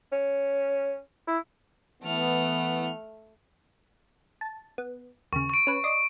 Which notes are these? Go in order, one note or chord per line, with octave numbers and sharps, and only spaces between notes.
C#4
E4
E3 A3 B3 F6
A5
B3
D#2 C#3 C#6
C#6 D7
C#4 B4
D5 D#5 C6